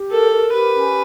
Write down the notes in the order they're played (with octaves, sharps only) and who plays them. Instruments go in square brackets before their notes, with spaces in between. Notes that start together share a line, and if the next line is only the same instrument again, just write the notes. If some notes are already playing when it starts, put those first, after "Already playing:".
Already playing: [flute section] G4
[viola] A4 [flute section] A#4
[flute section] A#4
[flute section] G4 [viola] B4
[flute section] C#4